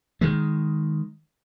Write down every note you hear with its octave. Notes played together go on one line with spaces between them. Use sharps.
D#3 G#3